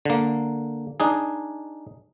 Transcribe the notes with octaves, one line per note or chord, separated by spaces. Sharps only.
D3 A#3
D4 D#4 G#4